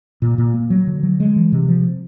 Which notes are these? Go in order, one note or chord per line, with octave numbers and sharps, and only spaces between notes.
A#2
A#2
A#3
F#3
D3
F#3
G#3
E3
C3
F3